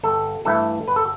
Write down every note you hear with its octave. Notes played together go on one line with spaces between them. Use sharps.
G1 A4
G2 E3 A3 E4 A4
G1 B4
A4